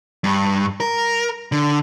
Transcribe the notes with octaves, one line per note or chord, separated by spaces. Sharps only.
G2
A#4
D3